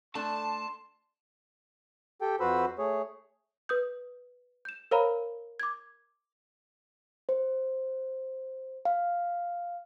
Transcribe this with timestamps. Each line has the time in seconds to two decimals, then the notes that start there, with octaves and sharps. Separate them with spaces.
0.15 A3 D4 A4 A5 C6
2.22 G4 A4 G5
2.40 F2 F#4 B4 C5 B5 E6
2.79 A3 G#4 C#5
3.69 B4 D#6 G6
4.65 G6 E7
4.91 A#4 C5 C#5 F5 A#5 B5
5.60 D6 G#6
7.29 C5
8.85 F5